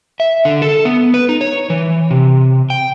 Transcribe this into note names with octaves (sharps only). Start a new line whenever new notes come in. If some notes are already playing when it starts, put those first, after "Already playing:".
E5
D3
A4
B3
B4
D#4
C#5
E3
C3
G5